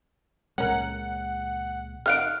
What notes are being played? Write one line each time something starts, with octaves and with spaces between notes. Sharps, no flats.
C#2 A#2 G#3 C#4 A#4 F#5
D#3 F5 F#5 F6 F#6 D7